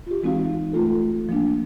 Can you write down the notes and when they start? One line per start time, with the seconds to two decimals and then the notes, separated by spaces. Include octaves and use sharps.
0.07 F4 G4
0.23 E3 G#3 C4 D#4 F#4 F5
0.73 A3 F4 A4
1.29 F3 A#3 D4